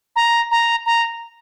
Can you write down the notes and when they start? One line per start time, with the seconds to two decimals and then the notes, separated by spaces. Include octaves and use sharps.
0.16 A#5
0.51 A#5
0.86 A#5